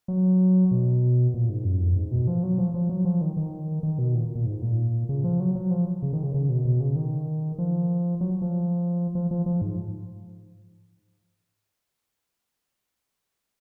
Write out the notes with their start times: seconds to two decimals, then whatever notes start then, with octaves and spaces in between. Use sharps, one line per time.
0.08 F#3
0.71 B2
1.34 A#2
1.49 G#2
1.65 F#2
1.80 F2
1.96 G#2
2.12 B2
2.27 F3
2.43 F#3
2.58 F3
2.74 F3
2.89 F#3
3.05 F3
3.21 D#3
3.37 D#3
3.83 D#3
3.99 B2
4.14 A#2
4.35 A#2
4.46 G#2
4.62 A#2
5.09 C#3
5.24 F3
5.40 F#3
5.55 F#3
5.71 F3
6.02 C#3
6.13 D#3
6.23 C#3
6.34 C#3
6.49 B2
6.65 B2
6.80 C#3
6.96 D#3
7.58 F3
8.21 F#3
8.42 F3
9.15 F3
9.31 F3
9.46 F3
9.62 G#2